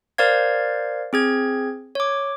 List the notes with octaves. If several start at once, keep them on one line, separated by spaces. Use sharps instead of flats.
A#4 C5 D5 F5 G#6
C4 G#4 G#6
C#5 D6